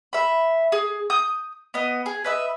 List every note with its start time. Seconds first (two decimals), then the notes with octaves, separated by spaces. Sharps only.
0.13 E5 B5
0.72 G#4
1.10 D#6 G6
1.74 B3 D#5
2.06 G#4
2.24 B4 D#5 E5